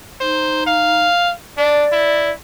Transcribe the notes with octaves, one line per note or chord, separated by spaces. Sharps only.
D#4 C5
F5
D4 D5
E4